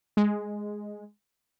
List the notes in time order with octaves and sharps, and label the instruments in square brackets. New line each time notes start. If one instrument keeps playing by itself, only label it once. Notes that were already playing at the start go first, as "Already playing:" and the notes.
[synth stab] G#3